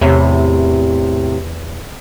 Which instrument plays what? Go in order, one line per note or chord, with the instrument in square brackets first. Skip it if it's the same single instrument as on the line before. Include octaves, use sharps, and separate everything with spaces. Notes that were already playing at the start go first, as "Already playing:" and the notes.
[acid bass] E2 [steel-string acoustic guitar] A2 C3